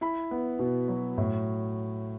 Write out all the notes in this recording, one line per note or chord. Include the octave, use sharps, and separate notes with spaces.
E4 B5
B3
B2
F#3
A2